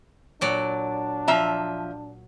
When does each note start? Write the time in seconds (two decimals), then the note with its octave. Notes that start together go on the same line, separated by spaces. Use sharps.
0.41 A#2 F#3 D4 D5
1.28 F3 E5 A#5